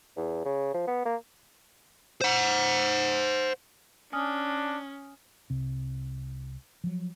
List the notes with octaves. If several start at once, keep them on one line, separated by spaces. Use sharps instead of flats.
E2
C#3
F3
B3
A#3
C5 F#5
C#4 D4 G#5 D#6 F6
C2 C3
F3 F#3